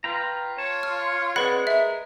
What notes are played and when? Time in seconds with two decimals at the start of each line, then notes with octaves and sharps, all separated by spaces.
0.04 F4 B4 G5 A#5
0.58 C#5 A5
0.83 F6
1.36 G#3 C4 B4 D5 F#5 B5
1.67 A#4 E5